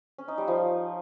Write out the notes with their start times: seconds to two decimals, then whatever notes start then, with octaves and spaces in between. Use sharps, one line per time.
0.18 C#4
0.28 D#4
0.38 G3
0.48 F3